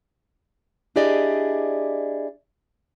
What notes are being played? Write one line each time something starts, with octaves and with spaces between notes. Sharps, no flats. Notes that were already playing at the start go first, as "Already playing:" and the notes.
D4 E4 G4 G#4 D5 D#5